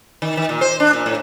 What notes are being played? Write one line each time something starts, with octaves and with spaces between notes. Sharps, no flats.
D#3
D#3
A#2
C5
D4
A#2
A2